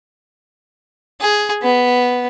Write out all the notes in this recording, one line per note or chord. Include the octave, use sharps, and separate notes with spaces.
G#4
B3